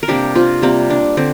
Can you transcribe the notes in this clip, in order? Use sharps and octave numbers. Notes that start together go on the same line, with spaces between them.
A#4
C3 G3 A#3 D4 G4
C4 F4
C3 G3 A#3 C4
D4
D3 C4